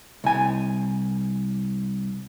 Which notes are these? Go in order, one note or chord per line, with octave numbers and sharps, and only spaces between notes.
C2 G#5